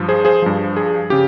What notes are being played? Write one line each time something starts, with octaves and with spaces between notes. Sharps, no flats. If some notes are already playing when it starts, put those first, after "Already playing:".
Already playing: G2 F3
G#4 C5
G#4 C5
G2 F3
G#4
C#3 G4